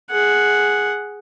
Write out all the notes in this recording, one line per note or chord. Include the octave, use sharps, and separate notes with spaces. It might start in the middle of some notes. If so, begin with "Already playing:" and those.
G#4 F#5